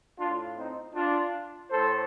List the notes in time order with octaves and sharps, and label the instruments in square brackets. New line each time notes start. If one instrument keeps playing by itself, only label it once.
[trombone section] A2 D4 F4
C4 D#4
D4 F4
A2 A4 C5